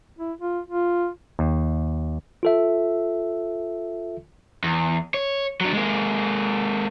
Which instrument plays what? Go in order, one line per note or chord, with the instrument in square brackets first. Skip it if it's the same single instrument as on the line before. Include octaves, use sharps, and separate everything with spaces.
[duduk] E4
F4
F4
[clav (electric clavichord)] D#2
[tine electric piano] F4 A4 E5
[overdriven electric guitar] E2
C#5
F#3 D4
G#3 A#3